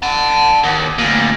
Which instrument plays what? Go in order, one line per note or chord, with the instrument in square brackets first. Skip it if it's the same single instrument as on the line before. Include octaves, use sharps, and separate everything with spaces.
[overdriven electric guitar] F#5 A5
D#2
D2 A#2